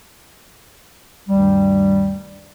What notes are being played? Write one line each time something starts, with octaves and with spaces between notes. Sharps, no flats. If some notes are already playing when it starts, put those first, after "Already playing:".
D2 G2 D#3 G3